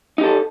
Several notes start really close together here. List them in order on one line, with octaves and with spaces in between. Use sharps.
D#4 G4 A4